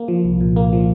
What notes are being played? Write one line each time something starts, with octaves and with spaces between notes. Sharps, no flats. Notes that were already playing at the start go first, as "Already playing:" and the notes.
Already playing: A#3
F3
C2
A#2
A#3
F3